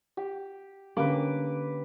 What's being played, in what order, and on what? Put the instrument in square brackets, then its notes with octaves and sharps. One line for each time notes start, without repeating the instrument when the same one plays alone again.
[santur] G4
[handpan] D3 C#4 G4 [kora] A#3 [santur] B4 D6